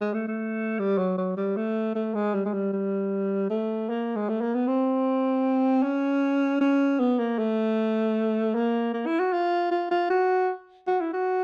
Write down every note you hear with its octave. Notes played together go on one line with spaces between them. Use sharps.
G#3
A3
A3
G3
F#3
F#3
G3
A3
A3
G#3
G3
G#3
G3
G3
A3
A#3
G#3
A3
A#3
B3
C4
C#4
C#4
B3
A#3
A3
A#3
A#3
E4
F#4
F4
F4
F4
F#4
F#4
E4
F#4